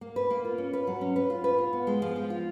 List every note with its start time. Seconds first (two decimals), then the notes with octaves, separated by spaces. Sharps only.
0.01 A#3
0.16 B4
0.30 A#3
0.45 F4
0.58 C#4
0.73 B4
0.87 F#3
1.01 C#4
1.16 B4
1.30 F4
1.44 B4
1.58 F4
1.73 B3
1.87 G#3
2.02 F3
2.16 F3
2.30 F4